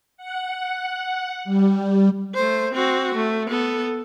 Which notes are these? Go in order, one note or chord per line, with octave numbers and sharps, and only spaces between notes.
F#5
G3
A3 C5
C4 F#4
A3
B3 A4